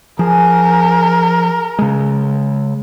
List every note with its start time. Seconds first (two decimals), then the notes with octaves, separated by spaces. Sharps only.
0.19 F3 G#4 A#4
1.79 C#3 G#3